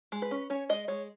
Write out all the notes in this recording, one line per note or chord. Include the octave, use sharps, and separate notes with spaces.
G#3
B4
C#4
C#4 C#5
G#3 D#5
G#3 C#5